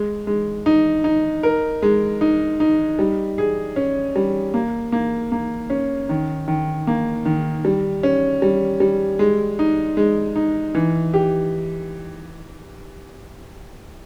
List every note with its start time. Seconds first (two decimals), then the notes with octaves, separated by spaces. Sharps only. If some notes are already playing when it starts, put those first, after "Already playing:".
Already playing: G#3
0.27 G#3
0.66 D#4
1.04 D#4
1.43 A#4
1.82 G#3
2.21 D#4
2.60 D#4
2.99 G3
3.38 G#4
3.76 C#4
4.16 G3
4.54 A#3
4.92 A#3
5.32 A#3
5.70 C#4
6.09 D#3
6.48 D#3
6.87 A#3
7.25 D#3
7.65 G3
8.03 C#4
8.42 G3
8.80 G3
9.19 G#3
9.59 D#4
9.97 G#3
10.36 D#4
10.75 E3
11.14 G4